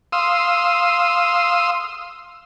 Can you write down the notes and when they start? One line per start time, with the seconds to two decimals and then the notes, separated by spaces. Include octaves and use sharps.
0.12 F5 C6 D#6 E6